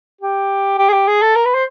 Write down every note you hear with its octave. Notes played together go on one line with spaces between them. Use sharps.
G4
G4
G#4
G4
G#4
A4
A#4
B4
C5